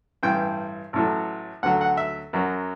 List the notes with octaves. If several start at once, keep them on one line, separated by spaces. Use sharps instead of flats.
A1 G2 E3 G5
A1 A2 F#3
D2 D3 F#3 F#5
F#5
E5
F#2 F#3